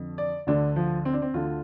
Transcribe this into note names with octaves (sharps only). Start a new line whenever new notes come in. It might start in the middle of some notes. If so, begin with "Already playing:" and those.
Already playing: F2 D3
D5
D2 D3 D4
F3
C4
D4
C4
D2 D3 F4